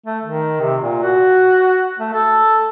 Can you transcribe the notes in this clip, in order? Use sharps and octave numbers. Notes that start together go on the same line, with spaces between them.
A3
D#3
C3
A#2
F#4
A3
A4